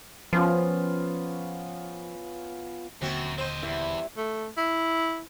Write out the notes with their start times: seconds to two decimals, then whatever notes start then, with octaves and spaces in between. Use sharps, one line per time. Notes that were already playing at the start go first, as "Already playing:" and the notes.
0.33 F3 B3 C#4 F4
3.01 D#1 F#2 D3 A#3 C4 F#4
3.38 C4 C5 D#5
3.63 E2 G3 E4
4.17 A3
4.57 E4